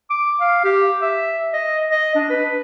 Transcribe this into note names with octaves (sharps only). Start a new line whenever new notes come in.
D6
F5
G4
E5
D#5
D#5
D4
B4